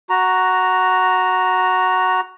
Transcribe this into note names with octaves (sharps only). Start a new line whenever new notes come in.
F#4 A#5